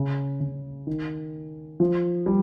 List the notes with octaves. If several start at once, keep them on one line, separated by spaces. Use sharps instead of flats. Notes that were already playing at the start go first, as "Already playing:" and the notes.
Already playing: C#3
C#3
D#3
F3
G3